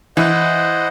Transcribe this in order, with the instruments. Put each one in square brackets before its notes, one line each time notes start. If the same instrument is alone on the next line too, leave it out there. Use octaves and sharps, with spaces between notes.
[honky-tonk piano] E3 [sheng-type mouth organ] C5 D#5 F#5